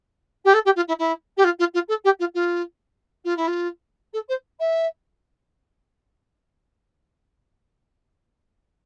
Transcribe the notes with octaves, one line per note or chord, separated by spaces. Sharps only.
G4
A4
G4
F4
E4
E4
G4
F4
F4
F4
A4
G4
F4
F4
F4
E4
F4
A4
C5
E5